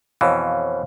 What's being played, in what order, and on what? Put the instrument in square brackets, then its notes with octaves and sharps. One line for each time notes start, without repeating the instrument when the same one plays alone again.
[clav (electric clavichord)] F2 B2 E3 [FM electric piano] C5 C#5 F5